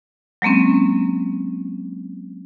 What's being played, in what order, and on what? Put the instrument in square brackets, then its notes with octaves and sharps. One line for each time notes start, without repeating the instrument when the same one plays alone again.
[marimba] F#3 G#3 A#3 C4 C#4